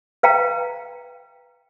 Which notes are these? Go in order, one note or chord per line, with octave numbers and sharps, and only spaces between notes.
B4 F5 G5 A#5